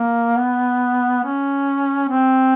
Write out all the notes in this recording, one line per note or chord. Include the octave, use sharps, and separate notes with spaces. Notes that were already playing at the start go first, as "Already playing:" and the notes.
Already playing: A#3
B3
C#4
C4